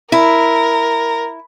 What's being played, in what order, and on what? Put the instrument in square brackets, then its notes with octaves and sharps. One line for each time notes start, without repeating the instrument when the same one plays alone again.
[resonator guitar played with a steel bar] E4 [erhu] A#4